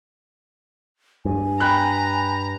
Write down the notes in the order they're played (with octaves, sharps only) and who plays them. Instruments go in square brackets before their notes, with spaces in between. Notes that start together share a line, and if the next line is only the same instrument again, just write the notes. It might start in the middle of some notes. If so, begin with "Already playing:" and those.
[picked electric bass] G2 [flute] G#5
[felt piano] G5 B5 F#6 [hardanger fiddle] A#5